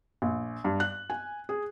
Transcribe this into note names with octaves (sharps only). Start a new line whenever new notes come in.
A#1
G2
F#6
G#5
G#4